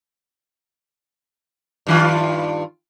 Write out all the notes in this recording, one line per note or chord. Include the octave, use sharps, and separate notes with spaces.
G2 D#3 F4